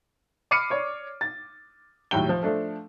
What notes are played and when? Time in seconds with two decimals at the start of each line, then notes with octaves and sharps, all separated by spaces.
0.51 B5 D6 F6 C7 C#7 D#7
0.70 C#5 D5
1.21 A6
2.11 D#2 A2 F#3 G3 G5 G7
2.29 F3
2.43 F3 A3 D4 A4